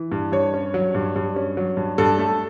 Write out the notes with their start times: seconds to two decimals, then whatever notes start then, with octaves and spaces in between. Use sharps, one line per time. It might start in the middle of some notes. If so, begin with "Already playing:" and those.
Already playing: E3
0.12 G2
0.32 G2 C#5
0.54 C#4
0.74 F#3
0.95 G2
1.16 G2
1.36 C#4
1.57 F#3
1.77 G2
1.98 G2 A4
2.19 A3